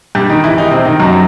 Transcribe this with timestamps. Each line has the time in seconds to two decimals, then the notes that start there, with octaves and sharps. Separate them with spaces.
0.15 G2 G3
0.29 D#3 D#4
0.44 E3 E4
0.57 D#3 D#4
0.71 C3 C4
0.85 D#3 D#4
1.00 F#2 F#3